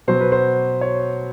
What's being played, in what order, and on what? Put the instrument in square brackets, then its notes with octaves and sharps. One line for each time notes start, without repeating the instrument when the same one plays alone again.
[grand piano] B2 F#3 C5
B4
C5
C#5